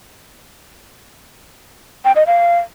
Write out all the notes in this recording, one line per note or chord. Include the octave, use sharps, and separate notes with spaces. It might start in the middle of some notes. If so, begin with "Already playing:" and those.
G5
D#5
F5